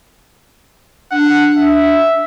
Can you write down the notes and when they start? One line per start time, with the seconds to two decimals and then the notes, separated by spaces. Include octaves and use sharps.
1.12 D4 F#5
1.57 E5